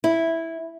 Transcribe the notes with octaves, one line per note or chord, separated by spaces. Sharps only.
E4